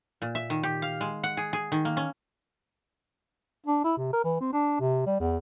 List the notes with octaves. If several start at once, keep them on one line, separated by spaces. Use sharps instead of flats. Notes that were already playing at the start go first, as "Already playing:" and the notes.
A#2
E5
D#3
G4
F5
G#3
F#5
G#4
G#4
D#3
A#3
C#4
D4
E4
C3
A#4
E3
C4
D4
C3
G3
E2